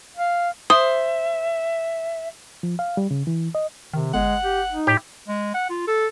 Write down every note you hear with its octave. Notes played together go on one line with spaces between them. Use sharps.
F5
C5 E5 D#6
F3
F5
G3
C#3
E3
D#5
C3 D#3
G1 G#3 F#5
G4
D#4
A2 G4
G#3
F#5
F4
A4